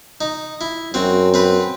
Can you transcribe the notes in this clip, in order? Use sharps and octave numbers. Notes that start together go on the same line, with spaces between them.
D#4
E4
F#2 C4 F#4
C4 B4